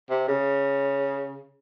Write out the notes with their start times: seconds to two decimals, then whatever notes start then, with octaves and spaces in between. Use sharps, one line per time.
0.10 C3
0.28 C#3